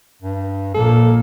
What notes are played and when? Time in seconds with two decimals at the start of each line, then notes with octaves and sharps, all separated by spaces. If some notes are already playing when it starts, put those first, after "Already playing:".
0.22 G2
0.75 A#1 A#2 A#3 A4